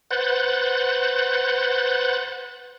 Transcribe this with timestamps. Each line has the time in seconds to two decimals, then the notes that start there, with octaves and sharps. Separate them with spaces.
0.11 B4 C5 F#5 F#6 G6 A6